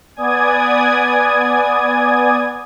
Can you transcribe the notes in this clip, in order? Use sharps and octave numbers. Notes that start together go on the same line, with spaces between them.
B3 D5 G#5 D#6 G#6